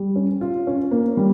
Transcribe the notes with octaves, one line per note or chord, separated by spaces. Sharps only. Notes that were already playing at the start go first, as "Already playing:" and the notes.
Already playing: G3
C#4
F4
C#4
A#3
G3